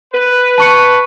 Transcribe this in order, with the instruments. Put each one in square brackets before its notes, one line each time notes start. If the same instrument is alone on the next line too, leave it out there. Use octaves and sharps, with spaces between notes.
[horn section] B4
[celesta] A5 C#6 C#7